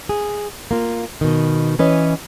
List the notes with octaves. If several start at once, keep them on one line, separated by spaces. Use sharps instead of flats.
G#4
A#3 F4
B2 D#3
E3 C#4 B4 D#5